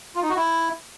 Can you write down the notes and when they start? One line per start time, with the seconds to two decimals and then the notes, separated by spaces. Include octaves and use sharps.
0.15 F4
0.22 D#4
0.29 F#4
0.36 E4